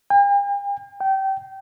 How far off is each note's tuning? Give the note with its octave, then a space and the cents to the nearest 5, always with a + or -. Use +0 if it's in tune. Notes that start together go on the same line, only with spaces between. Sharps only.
G5 +45
G5 -25